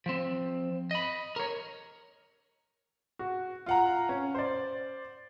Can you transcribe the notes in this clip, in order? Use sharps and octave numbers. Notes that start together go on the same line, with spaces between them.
F3 C4
D#5 B5
A#4 C#5
F#4
F4 F#5 A#5
C#4
C5 D5